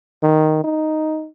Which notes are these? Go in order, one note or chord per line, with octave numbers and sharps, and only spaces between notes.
D#3
D#4